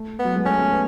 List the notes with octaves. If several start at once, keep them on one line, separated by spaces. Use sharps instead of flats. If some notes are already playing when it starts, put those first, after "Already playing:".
Already playing: A3
B3
F#3
G#3
A3 C#4
A3
B3